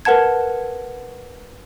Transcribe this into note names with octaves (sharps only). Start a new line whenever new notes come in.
A#4 B4 F#5 A5 G#6